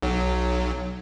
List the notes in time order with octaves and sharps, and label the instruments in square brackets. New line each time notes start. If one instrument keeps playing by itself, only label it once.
[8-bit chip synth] B1 F#3